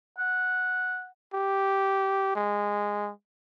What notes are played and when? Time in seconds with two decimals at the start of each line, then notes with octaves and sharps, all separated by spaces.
0.18 F#5
1.34 G4
2.36 G#3